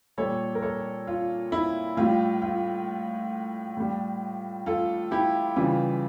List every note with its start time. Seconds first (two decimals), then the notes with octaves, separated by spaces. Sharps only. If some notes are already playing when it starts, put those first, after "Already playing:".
0.18 A#2 G3 A4 C#5
0.55 A#4
0.62 A4 C#5
1.07 F4
1.52 E4
1.97 A2 G3 F4
2.42 F4
3.77 A2 G3
4.66 F4 A4
5.11 E4 G4
5.56 C#3 E3 G3 F4